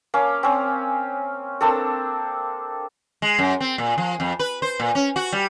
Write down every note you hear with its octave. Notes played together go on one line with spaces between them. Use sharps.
A#3 C#4 F5
C4 C#4
A#3 C4 D4 A4
G#3
F#2
C4
A#2
F3
F2
B4
C5
A#2
C#4
F#4
G3